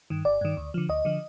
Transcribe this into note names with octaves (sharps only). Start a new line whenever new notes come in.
G2 D#3
G1 D5
G2 D#3
D2
D3 F3
D2 D#5
D3 F3